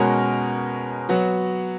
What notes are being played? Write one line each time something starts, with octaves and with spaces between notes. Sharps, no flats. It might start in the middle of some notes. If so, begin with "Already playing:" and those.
Already playing: B2 G#3 C#4 F#4 A#4
F#3 B3 F#4